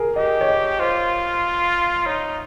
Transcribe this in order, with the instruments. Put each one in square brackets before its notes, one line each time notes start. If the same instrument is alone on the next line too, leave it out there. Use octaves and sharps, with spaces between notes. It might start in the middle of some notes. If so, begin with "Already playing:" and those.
Already playing: [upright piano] G#4 A#4
[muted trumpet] G4 [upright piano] D#5
[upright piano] C#5
D#5
[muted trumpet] F4 [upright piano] C5
[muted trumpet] D#4 [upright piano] C#5